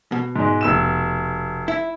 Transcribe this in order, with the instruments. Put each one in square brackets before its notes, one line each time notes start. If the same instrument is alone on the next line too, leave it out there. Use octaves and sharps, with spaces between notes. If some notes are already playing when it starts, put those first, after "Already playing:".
[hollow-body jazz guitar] B2
[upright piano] G#2 G#3
F1 E6 E7
[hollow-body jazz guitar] E4